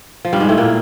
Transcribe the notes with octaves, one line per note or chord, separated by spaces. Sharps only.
F3
G2 G3
G#2 G#3
A2 A3
A#2 A#3